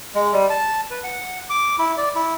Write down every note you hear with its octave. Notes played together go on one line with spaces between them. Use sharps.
G#3
G3
A5
B4
F#5
D6
E4
D5
E4